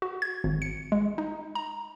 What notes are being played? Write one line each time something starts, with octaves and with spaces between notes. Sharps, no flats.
F#4
G#6
G#1
C#7
G#3
D#4
A#5